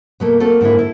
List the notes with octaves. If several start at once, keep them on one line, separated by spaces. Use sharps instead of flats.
B2 A3 A#3
A3 A#3 C4 F#4 A4
G#2 D3 A#3 E4
E4 A4